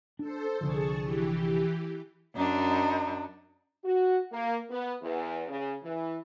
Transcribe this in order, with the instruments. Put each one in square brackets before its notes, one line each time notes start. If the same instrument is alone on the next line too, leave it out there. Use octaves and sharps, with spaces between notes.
[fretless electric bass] D4 [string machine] A4 C5
[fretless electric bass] C2 D3 F3 [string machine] G#4 A5 C#6
[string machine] E3 G4
[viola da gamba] F#2 D4 [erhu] D#4
[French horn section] F#4
A#3
B3
E2
C#3
E3